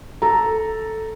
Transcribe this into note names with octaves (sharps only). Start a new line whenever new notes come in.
A4 A#5